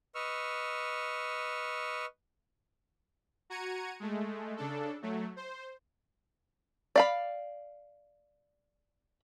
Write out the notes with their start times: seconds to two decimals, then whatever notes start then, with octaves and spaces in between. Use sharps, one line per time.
0.15 B4 D#5 C#6 E6 F6
3.50 F#4 A#5 G#6 C#7 D#7
4.00 G#3 A3
4.57 C#3 D4 A4
5.02 F#3 A3
5.36 C5
6.96 D5 F5 B5